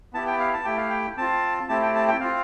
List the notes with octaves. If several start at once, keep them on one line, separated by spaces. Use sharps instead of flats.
B3 E4 G4 A5
G5
F5
A5
A3 E4 G4 G5
F5
G5
C4 F4 A5
A3 C4 E4 G4 A5
G5
A5
G5
C4 F4 F5